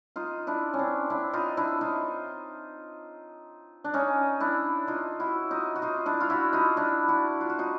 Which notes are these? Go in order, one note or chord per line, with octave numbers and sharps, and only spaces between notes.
D#4 F4
D4 E4
C#4
C4 D4
D4 E4
D#4 F4
D4 E4
D#4 F4
D4
C#4 D#4
D4 E4
D#4 F4
E4 F#4
D#4 F4
F#4
D#4 F4
D4 E4
F4
E4 F#4
D#4 F4
D4 E4
E4 F#4
F4
F#4
D#4 F4